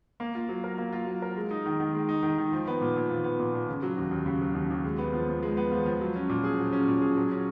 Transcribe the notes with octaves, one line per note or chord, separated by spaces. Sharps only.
A#3
F4
F#3
A#4
A#3
F4
F#3
A#4
G#3
D#4
D#3
D#3
G#3
D#4
D#3
D#3
F3
B3
A#2
A#2
F3
B3
A#2
A#2
C#3
F#3
D#2
D#2
C#3
F#3
D#2
D#2
G#3
B3
F3
F3
G#3
B3
F3
F3
F#3
C#4
A#2
G#4
F#3
C#4
A#2
G#4
F#3
C#4